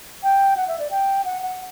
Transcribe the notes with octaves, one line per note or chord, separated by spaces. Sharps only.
G5
F#5
E5
D5
G5
F#5
F#5